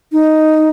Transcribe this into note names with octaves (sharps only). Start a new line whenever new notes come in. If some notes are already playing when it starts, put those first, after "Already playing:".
D#4